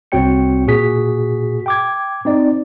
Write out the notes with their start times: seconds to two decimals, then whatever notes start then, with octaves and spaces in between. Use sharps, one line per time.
0.12 C2 C4 F#4 C#5 G5 C#7
0.67 A#2 F#4 G#4 B6
1.66 G5 D6 G#6
2.25 C4 D#4 D5